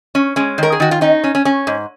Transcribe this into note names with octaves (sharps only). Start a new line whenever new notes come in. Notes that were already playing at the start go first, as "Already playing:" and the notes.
C#4
G#3 C#4
D#3 A#4
G#4
D#3 F#4
F4
C#4 D#4
C#4
C#4
C#4
G#2